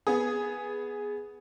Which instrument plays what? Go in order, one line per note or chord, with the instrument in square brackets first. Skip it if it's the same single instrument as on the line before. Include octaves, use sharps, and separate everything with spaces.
[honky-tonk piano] B3 G#4